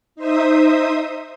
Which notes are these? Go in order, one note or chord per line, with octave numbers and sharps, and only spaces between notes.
D#4 C5 E5 D#6